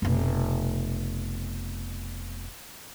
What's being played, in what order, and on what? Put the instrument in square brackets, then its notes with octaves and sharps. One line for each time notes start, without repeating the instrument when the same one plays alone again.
[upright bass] F1 B2